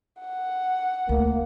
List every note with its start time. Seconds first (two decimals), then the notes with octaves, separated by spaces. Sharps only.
0.20 F#5
1.09 D2 A#3